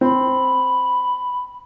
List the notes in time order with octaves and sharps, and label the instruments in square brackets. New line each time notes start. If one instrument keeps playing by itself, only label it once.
[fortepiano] C4 [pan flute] B5